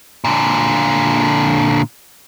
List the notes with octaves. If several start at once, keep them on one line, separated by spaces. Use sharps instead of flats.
A#2 D3